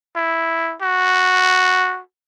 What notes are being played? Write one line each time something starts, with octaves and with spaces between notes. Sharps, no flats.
E4
F#4